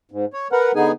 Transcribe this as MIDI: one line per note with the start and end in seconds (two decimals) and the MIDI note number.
0.12 0.25 44
0.33 0.48 73
0.52 0.72 70
0.52 0.72 71
0.52 0.72 78
0.76 0.92 50
0.76 0.92 59
0.76 0.92 63
0.76 0.92 68
0.76 0.92 80